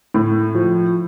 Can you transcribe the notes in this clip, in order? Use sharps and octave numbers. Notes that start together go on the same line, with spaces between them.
A2
F3